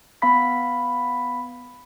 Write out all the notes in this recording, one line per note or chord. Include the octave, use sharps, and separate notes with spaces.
B3 F5 B5 B6